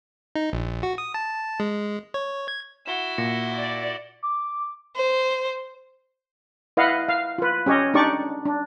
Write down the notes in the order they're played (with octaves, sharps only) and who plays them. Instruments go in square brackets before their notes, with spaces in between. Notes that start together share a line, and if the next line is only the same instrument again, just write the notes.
[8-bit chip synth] D#4
A#1
F#4
D#6
A5
G#3
C#5
G#6
[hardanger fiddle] E4 F#4 [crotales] E7 G7
[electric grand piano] A#2 [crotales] A#6 C#7
[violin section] D5
[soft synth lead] D6
[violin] C5
[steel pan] E4 B4 D#5 F5 F#5
F5
F4 B4
C#4 G4 C#5 D#5
D4 D#4 G4 D5 C#6
D4